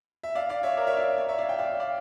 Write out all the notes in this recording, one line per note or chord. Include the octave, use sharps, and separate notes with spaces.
E5
D5 F5
D5 F5
C#5 E5
A#4 D5
C#5 E5
D5 F5
C#5 E5
C#5 E5
D5 F5
E5 G5
D5 F5
D5 F5